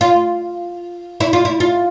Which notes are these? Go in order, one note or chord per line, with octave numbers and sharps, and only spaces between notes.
F4
E4
F4
E4
F4